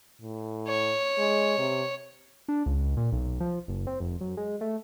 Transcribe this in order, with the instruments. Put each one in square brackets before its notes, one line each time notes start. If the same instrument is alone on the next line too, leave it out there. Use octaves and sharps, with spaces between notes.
[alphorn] A2
[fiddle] C#5
[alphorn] G#3
C3
[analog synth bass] D4
C#2
A#2
B1
F3
F#1
C4
F1
F#2
G#3
A3